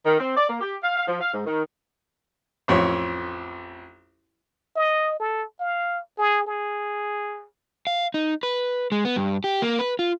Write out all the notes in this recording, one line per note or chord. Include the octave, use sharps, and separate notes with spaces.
D#3
C4
D5
A#3
G4
F5
F5
F3
F5
G#2
D#3
A1 F2 C#5
D#5
A4
F5
G#4
G#4
F5
D#4
B4
G#3
B3
G2
G4
A#3
B4
F4